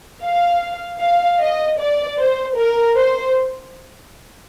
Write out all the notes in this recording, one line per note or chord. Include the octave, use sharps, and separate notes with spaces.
F5
F5
D#5
D5
C5
A#4
C5